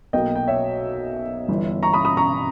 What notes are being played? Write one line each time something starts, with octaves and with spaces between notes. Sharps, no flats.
B1 B2 A#3 D#5 G5
G5
C#5 E5
G1 G2 E3
A#5 C#6
B5 D#6
B5 D#6
A#5 C#6